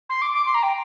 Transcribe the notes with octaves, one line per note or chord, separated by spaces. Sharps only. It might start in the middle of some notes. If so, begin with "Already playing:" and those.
C6
D6
D6
C6
A#5
G5